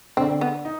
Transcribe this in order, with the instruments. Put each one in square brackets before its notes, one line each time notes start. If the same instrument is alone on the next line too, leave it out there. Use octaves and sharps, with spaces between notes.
[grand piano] D3 D4 [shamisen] C4
[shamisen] B3
[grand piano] D#4